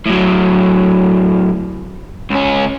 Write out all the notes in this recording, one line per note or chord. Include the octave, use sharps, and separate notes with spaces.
A2 F#3
C#2 C#4